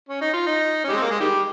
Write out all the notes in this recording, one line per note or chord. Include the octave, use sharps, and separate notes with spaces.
C#4
D#4
F4
D#4
C#4
G3
G#3 C4
A#3
G#3
D#3 G3